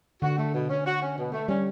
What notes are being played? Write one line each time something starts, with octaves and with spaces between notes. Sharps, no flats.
D3 F#4
A3
B2
C#4
F#4
C#4
B2
A3
G3 C#4